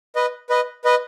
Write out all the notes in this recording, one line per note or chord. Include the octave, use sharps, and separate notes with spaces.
B4 D#5
B4 D#5
B4 D#5